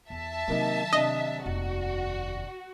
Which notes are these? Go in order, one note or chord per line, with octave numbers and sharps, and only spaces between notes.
E2 E5 A5
C3 D#3 F#3 A#3 D#4
C3 D4 D#5
F1 D#2 F#4